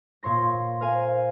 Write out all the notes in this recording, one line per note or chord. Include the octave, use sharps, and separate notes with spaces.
A#2 C#5 C6 A#6
A#4 C5 F5 G#5 A#5